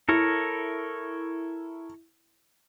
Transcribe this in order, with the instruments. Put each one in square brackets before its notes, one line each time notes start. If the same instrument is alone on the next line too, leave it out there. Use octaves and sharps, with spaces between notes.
[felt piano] E4 [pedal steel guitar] A4 A#4 C#5